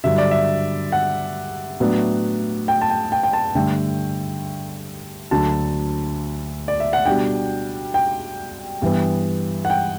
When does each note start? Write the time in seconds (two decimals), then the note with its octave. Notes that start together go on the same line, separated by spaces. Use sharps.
0.04 G2 D3 F#3 E5
0.18 D5
0.31 E5
0.92 F#5
1.80 A2 F#3 B3 D4
2.68 G5
2.81 A5
2.90 G5
3.12 G5
3.23 G5
3.33 A5
3.55 G2 D3 A3 G5
5.31 D2 D3 F#3 A5
6.68 D5
6.80 E5
6.93 F#5
7.06 B2 G3 D4 G5
7.94 G5
8.82 G2 E3 B3
9.65 F#5
9.70 G5